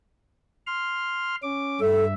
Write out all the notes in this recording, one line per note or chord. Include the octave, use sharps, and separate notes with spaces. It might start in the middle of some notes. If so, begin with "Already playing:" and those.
C6 F6
C#4 D6
G2 A4 E5